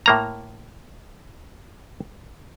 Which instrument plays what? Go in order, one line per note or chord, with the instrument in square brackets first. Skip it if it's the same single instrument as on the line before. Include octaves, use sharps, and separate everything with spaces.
[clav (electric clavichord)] A2 A#3 A#5